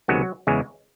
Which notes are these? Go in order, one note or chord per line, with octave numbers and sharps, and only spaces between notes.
C#2 C3 D#3 F#3 G#3 B3 F#4
E2 C#3 E3 G#3